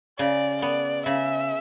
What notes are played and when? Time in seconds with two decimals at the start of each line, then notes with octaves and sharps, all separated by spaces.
0.19 C#3 D5
0.62 B3 D5
1.06 C#3 E5